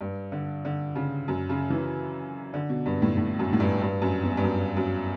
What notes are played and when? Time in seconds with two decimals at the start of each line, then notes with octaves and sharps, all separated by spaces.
0.01 G2
0.32 D3
0.65 D3
0.95 C#3
1.28 F#2
1.49 C#3
1.70 E3
2.54 D3
2.69 B2
2.86 G2
3.02 A2
3.17 A2
3.39 F#2
3.53 A2
3.60 G2
3.81 G2
4.02 F#2
4.23 E2
4.37 G2
4.44 F#2
4.77 F#2